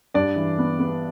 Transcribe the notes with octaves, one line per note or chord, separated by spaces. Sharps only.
G2 D4 D5
E3
B3
B3